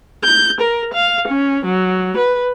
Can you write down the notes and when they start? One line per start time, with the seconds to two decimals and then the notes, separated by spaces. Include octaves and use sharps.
0.24 G6
0.61 A#4
0.94 F5
1.27 C#4
1.65 F#3
2.17 B4